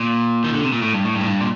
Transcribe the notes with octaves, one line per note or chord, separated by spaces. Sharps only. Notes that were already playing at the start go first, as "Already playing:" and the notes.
Already playing: A#2
D#3
D3
C3
A#2
A2
G2
A2
G2
A2
G2
A#2